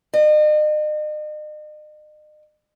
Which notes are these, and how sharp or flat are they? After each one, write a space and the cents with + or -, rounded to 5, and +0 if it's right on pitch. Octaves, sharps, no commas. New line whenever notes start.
D#5 -40